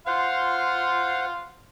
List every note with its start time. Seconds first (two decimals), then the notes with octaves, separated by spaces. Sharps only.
0.07 C5 F5 F#5 C6 F6